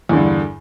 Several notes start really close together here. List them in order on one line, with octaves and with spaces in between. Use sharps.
E2 D3 G2